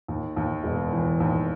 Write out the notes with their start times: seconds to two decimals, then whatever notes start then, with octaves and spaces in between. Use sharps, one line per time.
0.08 D#2
0.37 D#2
0.64 E1
0.92 E3
1.20 D#2